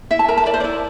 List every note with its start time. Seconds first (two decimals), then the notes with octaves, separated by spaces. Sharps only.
0.11 E4 E5
0.19 A5
0.28 A#4 A#5
0.38 A5
0.46 A#4 D5
0.54 C5
0.60 E4 D5